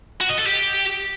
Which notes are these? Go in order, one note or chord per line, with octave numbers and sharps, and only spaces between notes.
F#4
D#5
A4
G4